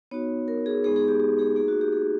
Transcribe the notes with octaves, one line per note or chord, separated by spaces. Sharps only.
B3 D#4 F#4 C#5
A#4
G#4
G#3 B3 D#4 G#4
G#4
G4
G4
G#4
A#3 D#4 F#4 G#4
F#4
G4
G#4